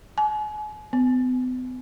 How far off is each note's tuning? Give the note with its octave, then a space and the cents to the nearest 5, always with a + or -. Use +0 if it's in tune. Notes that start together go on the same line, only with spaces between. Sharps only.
G#5 +40
B3 +45